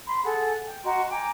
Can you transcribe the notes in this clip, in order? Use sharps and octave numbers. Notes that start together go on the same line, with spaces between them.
B5 C6
G#4 A4 F#5
G5
F#4 D#5 A#5 C6
G5 G#5 A#5 D6